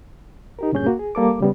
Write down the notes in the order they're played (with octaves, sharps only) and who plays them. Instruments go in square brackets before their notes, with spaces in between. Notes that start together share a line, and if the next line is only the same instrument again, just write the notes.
[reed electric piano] D#4 G4 A#4
D2 G2 A#2 C#4 G#4 G6
A#3 F#4
G#4
G3 A#3 A4 D6
C#3 G3 B3